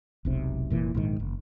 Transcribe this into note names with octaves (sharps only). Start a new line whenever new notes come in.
E1 B1 C3
F1 A#2 E3
A#1 G#2 D#3
F#1